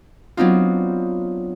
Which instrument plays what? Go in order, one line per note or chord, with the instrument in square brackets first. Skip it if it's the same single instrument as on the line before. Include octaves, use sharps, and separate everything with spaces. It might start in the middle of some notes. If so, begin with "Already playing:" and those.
[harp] F#3 B3 C4 D4 D#4 F4